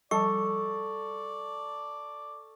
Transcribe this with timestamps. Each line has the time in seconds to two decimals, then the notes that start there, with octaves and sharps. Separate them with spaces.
0.11 F3 G3 A4 D5 C#6